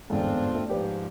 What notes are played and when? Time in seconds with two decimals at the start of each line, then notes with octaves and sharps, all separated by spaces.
0.10 G1 E2 G#2 C4 D4 F4
0.55 A3
0.69 G#2 F3 G4 B4 D5